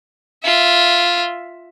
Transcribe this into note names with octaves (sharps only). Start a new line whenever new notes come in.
F4 E5